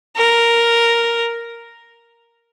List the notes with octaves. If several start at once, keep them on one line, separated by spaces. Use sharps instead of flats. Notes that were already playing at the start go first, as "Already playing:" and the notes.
A#4